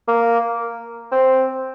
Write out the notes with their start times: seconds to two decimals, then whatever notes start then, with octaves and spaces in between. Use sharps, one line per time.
0.08 A#3
1.12 C4